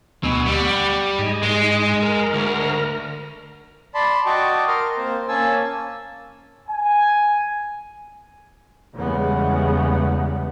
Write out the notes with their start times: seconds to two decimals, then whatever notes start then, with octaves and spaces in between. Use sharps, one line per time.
0.23 D2 B2 G#5 E6
0.46 G3 F#5 B5
1.19 G#2 D#5 G#5
1.43 G#3
2.02 A#4 A#5
2.33 D2
3.95 D5 A5 B5 C6
4.26 F#4 D#5 G5 A5 C#6 D6
4.68 A#4 A#5 C6 F6
4.97 A#3 C4 C5
5.28 A#3 C#4 G#5 A5 E6
6.68 G#5
8.94 E2 C#3 G3 G#3 B3